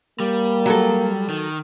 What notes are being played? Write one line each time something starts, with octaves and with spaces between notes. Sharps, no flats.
G3 A#3
F#3 A4
D#3